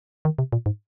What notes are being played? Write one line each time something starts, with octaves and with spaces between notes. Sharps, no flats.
D#3
C3
A#2
G#2